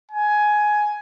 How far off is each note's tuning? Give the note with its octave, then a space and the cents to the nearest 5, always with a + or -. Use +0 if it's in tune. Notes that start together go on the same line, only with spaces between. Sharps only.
G#5 +15